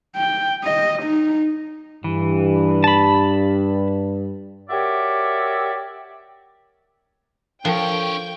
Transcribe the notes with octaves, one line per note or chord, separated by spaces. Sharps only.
G5
D#5
D#4
G2 E3
A5 B5
F#4 G4 A#4 C#5 D5 E5
F3 D4 A4 A#4 C#5 G5